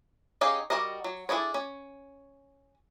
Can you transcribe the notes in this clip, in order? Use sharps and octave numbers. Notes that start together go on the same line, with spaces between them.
C#4 D#4 G4 G#4 F5
G3 F#4 A4 A#4 D#5
F#3
D4 E4 G#4 A4 C#5
C#4